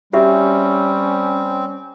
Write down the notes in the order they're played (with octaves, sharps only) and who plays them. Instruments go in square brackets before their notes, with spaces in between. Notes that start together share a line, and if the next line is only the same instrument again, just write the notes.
[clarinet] G3 [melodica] C4 [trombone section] C#4 [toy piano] F#4 G4 E5